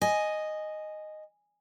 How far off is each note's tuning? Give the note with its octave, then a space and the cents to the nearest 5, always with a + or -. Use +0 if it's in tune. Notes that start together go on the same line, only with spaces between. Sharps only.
D#5 -5 G#5 +0